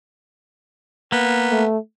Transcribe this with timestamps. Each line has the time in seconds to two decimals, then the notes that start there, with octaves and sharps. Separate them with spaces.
1.12 A#3 B3
1.51 A3